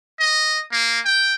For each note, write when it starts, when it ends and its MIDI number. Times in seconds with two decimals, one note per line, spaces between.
0.20 0.62 75
0.71 1.00 58
1.04 1.35 79